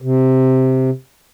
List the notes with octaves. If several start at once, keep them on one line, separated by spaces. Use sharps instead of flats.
C3